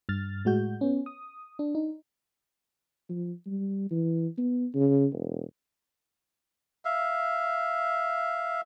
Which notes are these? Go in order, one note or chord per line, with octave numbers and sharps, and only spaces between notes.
G2 F6 A6
A2 G#3 F#4 G6
B3 C#4
D#6
D4
D#4
F3
G3
E3
B3
C#3
E1
E5 F5